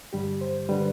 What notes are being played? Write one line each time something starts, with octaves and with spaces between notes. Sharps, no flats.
G2 D3 G3 G4
C5
D3 G3 B4